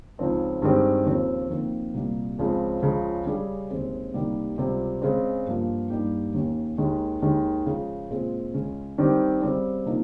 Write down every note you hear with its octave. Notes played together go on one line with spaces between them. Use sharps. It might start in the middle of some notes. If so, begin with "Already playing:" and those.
C#2 C#3 F3 C4 D#4
G2 D#3 G#3 C4 G4
D#2 C#3 F3 C4
F2 D#3 A#3
C2 A#2 G3 A#3
C#2 C#3 F3 G#3 C4
C#2 C#3 F3 G#3
C#3 G3 C#4 G#4
D#2 C#3 G#3 C4
C2 C3 D#3 G3 A#3
C#2 C3 G3 C4 F4
C#3 G#3 C4
G2 F3 A#3
G2 G3 A#3 D#4 G4
D#2 D#3 A#3 C#4
D#2 D#3 G#3
D#2 D#3 G#3
C#3 F3 G#3
A#2 G#3 C4 F4 G#4
C#2 C#3 G#3 C#4
D#3 G3 C4 G4
C#3 G3 C4
C3 F3 A#3 D#4